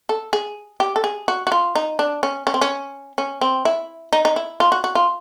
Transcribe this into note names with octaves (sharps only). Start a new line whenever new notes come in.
A4
G#4
G4
A4
G#4
F#4
F#4
F4
D#4
D4
C#4
C#4
C4
C#4
C#4
C4
E4
D#4
D#4
E4
F4
F#4
F#4
F4